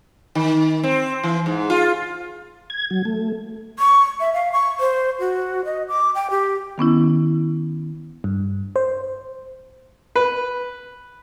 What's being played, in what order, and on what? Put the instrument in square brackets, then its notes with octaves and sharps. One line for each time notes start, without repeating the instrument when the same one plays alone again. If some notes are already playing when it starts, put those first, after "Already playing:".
[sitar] D#3
C4
E3
G#2
F4
[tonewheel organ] G#6
F#3
A3
[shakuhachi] C#6
E5
F5
C#6
C5
F#4
D#5
D6
G5
G4
[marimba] D#3 B3 C#4 E4
[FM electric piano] G2
C5
[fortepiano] B4